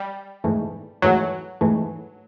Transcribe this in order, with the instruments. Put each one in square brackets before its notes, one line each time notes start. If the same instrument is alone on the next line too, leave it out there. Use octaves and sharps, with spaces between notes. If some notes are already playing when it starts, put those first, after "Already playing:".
Already playing: [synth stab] G3
[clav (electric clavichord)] G#2 E3 A3
[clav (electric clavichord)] G#2 E3 A3 [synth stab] F#3
[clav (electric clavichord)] G#2 E3 A3